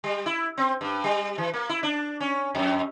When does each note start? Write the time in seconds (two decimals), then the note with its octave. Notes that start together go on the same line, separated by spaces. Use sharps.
0.04 G3
0.26 E4
0.58 C4
0.81 G2
1.04 G3
1.38 E3
1.54 A#3
1.69 E4
1.83 D4
2.20 C#4
2.55 F2